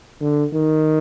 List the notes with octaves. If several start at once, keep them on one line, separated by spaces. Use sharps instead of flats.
D3
D#3